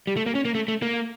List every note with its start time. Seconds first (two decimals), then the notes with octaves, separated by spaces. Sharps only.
0.07 G3
0.17 A3
0.26 A#3
0.35 C#4
0.45 A#3
0.55 A3
0.68 A3
0.82 A#3